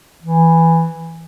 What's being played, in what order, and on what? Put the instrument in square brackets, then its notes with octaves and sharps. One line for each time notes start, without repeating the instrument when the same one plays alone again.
[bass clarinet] E3